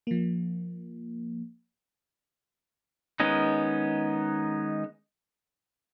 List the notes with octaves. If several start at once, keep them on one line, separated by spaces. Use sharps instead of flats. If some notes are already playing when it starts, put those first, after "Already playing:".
F3 A#3
D#3 G#3 B3 C#4 D#4